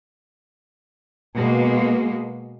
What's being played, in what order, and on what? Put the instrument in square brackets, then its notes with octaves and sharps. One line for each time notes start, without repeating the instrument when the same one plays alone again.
[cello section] B2 G#3 A#3